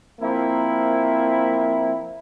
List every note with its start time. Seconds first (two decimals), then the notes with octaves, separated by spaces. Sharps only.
0.21 F3 A#3 C4 E4